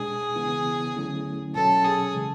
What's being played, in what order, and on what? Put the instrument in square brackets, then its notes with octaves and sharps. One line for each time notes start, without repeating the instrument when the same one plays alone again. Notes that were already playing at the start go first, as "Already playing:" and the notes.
Already playing: [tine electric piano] B2 G#3 D4 [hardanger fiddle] G#4
[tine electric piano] C#3 E3 B3 E4
D3 F#3 A3 C#4 E4
[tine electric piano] B2 F#3 C#4 [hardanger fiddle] A4
[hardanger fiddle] G#4
[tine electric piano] C#3 E3 G#3